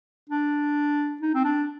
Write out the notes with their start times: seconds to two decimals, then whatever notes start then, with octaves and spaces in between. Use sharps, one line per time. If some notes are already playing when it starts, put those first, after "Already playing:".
0.29 D4
1.21 D#4
1.34 C4
1.44 D4